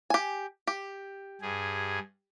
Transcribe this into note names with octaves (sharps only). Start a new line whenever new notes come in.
G4 G#5
G4
G2 G#4